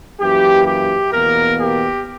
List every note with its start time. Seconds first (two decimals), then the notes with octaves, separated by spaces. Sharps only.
0.20 F#2 E3 A#3 G4
0.66 G4
1.13 E2 B2 A#3 A#4
1.60 G4